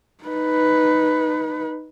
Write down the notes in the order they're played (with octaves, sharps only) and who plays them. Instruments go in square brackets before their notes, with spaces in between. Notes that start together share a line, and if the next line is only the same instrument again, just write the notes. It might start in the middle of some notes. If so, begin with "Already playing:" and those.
[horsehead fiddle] D#4 B4